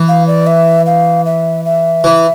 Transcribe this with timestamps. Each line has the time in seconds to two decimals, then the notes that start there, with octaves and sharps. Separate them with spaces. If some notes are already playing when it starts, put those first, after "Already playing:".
Already playing: E3
0.08 F5
0.27 D5
0.47 E5
0.86 F5
1.26 E5
1.65 E5
2.04 E3